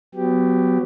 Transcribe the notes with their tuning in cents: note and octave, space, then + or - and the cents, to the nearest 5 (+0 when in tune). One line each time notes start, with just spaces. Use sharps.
F#3 +0 B3 +25 G4 +0